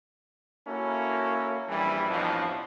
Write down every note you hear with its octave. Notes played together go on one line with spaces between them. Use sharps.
A#3 C#4 E4 F#4 A4
A#1 E3 G3
A1 F2 B2 F3 D4